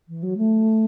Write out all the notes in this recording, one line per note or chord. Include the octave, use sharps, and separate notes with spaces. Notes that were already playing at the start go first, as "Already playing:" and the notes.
E3
F#3
A3